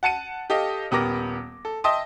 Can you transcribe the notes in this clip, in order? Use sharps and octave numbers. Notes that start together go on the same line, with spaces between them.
F#5 A5 C#7 D#7
G4 A4 D#5 F5
D#1 B3 G4 A#4 D6 A#6
A4
D#5 E5 G5 A5 C6 D#6